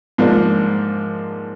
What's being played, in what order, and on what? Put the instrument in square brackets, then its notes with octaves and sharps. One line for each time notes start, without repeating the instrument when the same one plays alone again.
[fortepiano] G#2 F3 A#3 D4